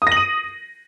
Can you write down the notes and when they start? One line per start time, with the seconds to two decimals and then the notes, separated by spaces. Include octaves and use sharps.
0.02 D#6
0.07 A#6
0.12 F#7
0.17 D#7